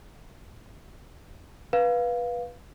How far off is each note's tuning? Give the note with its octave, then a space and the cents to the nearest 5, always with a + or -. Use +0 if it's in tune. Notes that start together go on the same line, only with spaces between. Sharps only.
B4 -15 F5 +10